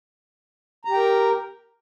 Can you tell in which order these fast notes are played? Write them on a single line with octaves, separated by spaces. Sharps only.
A#5 G4 G5 A#4